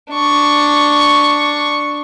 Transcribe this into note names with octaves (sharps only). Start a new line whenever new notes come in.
D4 C#6